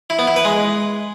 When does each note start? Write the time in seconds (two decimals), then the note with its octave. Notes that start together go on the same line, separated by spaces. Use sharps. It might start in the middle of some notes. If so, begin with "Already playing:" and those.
0.10 E4
0.19 B3
0.27 E4
0.36 B4
0.45 G#3